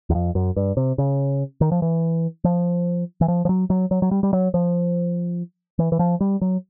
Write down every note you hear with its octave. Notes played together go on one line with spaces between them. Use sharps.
E2
F2
F#2
G2
C3
C#3
D#3
F3
E3
F3
E3
F3
F3
F#3
F#3
F#3
F#3
G3
G3
F#3
F3
E3
E3
F3
G3
F#3